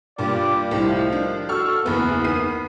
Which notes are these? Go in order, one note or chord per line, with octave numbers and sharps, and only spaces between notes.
G2 A#2 F4 G4 D5
C2 A2 D#3 F3 G3
D4
F#4 A4 C#6 F6
F#1 E2 B3
D#3 C7 D#7